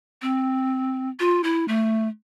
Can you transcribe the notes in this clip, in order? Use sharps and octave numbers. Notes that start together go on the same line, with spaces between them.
C4
F4
E4
A3